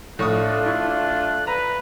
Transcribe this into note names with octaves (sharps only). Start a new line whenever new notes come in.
A2 A3 D4 F4 C#6 D#6 F#6
E4 C#6
B4 A#5